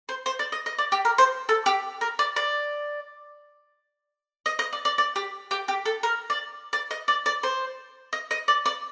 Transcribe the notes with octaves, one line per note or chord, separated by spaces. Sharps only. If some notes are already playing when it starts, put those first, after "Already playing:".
C5
C5
D5
D#5
D#5
D5
G4
A#4
C5
A4
G4
A#4
D5
D5
D#5
D#5
D5
D5
D5
G4
G4
G4
A4
A#4
D5
D5
D#5
D5
D5
C5
D#5
D#5
D5
D5